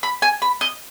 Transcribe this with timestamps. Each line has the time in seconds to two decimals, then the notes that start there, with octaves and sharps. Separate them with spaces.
0.03 B5
0.22 G#5
0.42 B5
0.61 D#5